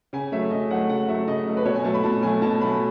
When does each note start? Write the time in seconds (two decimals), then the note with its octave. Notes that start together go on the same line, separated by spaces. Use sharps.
0.13 C#3 G#5
0.32 F#3 A3 E5
0.51 C#3 D#5
0.71 F#3 A3 F#5
0.89 C#3 F#5
1.08 F#3 A3 E5
1.27 C#3 D#5
1.47 F#3 A3
1.57 B4
1.66 B2 C#5
1.75 G#5
1.84 F#3 A3 A5
1.94 B5
2.03 B2 A5
2.23 F#3 A3 G#5
2.42 B2 A5
2.61 F#3 A3 B5